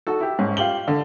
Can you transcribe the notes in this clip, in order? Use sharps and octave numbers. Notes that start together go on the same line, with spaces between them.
D#4 F#4 A4
E4 G4
G#2 C#4
F4 G4 F#7 G7
D3